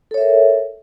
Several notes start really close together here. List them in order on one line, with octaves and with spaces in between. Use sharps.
A4 C#5 E5 A#4